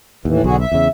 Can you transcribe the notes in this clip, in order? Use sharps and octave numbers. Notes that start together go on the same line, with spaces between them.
D#2 A2 E3
B1 D3 F#4 G#4
E5
E2 C#3